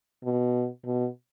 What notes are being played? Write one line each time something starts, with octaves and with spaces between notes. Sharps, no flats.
B2
B2